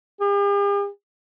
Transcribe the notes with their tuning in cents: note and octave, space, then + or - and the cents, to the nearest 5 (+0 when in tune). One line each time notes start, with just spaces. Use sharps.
G4 +45